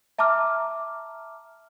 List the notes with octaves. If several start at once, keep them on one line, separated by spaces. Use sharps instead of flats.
E5 A5 A#5 D6 F6